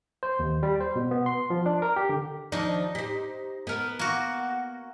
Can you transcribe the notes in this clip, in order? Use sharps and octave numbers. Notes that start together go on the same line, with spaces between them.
C5
D#2
G3
C5
B2
B3
C6
F3
D4
A#4
G4
D3
D#2 F3 D4 D#4
G4 C5
B3 A#4
A#3 F#4